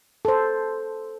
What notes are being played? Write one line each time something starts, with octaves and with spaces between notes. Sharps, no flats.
A4 C5